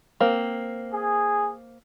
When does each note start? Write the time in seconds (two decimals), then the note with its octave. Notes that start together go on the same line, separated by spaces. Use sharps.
0.20 A#3 C4
0.92 G#4